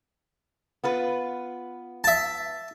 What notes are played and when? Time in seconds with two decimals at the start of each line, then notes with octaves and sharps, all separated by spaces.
0.84 B3 F4 B4
2.04 E5 A5